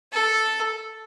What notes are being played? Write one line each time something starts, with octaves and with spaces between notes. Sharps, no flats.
A4